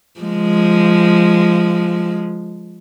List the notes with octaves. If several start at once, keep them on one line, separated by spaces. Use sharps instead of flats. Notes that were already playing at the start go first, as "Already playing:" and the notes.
F3 G#3